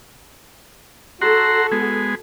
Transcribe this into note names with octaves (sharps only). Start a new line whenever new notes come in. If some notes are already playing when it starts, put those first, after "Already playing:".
F#4 A4 F#5 A#5 C6
G#3 B3 G#4